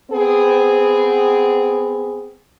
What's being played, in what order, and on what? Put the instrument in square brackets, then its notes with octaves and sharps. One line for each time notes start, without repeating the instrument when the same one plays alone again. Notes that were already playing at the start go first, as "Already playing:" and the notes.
[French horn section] B3 C4 G#4